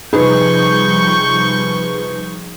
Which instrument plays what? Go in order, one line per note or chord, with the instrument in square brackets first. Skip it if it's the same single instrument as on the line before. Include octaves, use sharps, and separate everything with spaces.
[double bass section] C3 F3 G3 [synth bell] D#4 G#4 [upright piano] B4 [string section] C#6 G6